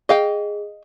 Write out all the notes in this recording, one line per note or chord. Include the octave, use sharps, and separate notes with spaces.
G#4 D#5 F5 G5